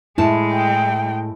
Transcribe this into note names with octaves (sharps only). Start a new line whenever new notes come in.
A2 G#3 E4 A5
G5